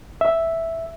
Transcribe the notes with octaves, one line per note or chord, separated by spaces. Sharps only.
E5